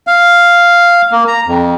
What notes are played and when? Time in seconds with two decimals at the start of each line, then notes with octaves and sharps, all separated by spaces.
0.07 F5
1.12 A#3
1.28 A#5
1.47 F2